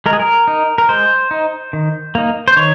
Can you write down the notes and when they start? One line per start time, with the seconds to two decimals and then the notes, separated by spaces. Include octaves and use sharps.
0.06 G#3 A#4
0.13 G#4
0.19 A#4
0.48 D#4
0.78 A#4
0.89 G#3 C5
1.31 D#4
1.73 D#3
2.15 A#3 D#4
2.48 C5
2.56 D#3 C#5